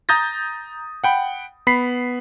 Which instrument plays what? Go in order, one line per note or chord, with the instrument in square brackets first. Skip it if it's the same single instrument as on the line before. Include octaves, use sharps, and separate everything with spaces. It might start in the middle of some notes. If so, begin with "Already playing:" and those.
[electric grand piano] A#5 D#6 G6 A6 A#6
F#5 G5 B5
B3 B5 B6 C7